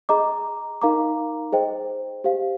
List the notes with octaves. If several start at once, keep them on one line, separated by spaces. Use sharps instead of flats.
G#4 D#5 A#5 D6
D#4 A#4 F5 A#5 D6
G#4 C5 D#5 G5
G4 C5 F5